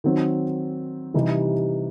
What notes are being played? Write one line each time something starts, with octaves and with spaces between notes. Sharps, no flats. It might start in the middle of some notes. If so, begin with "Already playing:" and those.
D#3 F#3 C4
C3 E3 G3 D#4